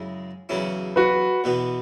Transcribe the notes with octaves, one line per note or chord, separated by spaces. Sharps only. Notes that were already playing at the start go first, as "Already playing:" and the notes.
Already playing: F#2 C#3 G#3 E4
E2 C#3 F#3 C#4 E4
F#4 B4
E2 B2 B3